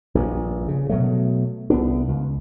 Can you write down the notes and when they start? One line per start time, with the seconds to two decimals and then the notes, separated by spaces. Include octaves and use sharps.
0.15 A#1 G2
0.68 C#3
0.89 B2 F#3 A3
1.70 C2 B3 D4
2.08 C#2